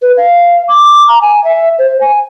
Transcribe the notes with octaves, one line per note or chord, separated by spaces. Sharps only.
B4
F5
D6
A#5
G#5
E5
C5
G#5